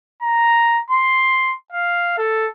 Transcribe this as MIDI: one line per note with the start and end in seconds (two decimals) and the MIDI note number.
0.23 0.80 82
0.90 1.53 84
1.72 2.14 77
2.18 2.47 69